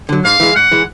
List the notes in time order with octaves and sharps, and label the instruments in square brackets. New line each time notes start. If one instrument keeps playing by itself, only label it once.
[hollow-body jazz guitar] D3 F#3
[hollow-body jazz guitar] G#2 [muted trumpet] F5
[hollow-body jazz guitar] E3 G#3
[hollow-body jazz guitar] G#2 [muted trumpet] F#5
[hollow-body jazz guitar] E3 G#3